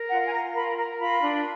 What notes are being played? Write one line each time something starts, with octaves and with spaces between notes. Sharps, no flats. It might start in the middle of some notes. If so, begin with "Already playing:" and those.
Already playing: A#4
F4 F#5
G#5
F4 A#5
A#4 B5
A#4 A#5
F4 B5
D4